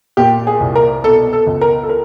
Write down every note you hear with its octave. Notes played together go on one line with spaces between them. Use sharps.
A#2 G4
G#4
C2
A#4
B2 A4
A4
C#2
A#4
A4
A#4